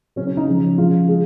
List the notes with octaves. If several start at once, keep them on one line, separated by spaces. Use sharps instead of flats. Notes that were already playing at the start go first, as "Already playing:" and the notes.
C#3 F#3 C#4
C#4
D#4
C#3 F3 G#3
C#3 F3 G#3 F4
G#3